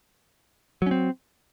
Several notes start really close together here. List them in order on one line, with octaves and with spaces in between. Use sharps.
F#3 C#4 C4